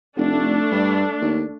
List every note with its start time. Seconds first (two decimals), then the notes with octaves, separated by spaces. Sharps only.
0.17 F1 A3 D4
0.72 G2
1.22 D#2